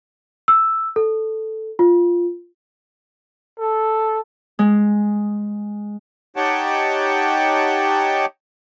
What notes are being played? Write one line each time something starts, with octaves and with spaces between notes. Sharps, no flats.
E6
A4
F4
A4
G#3
D#4 G4 C#5 F#5 G5 A5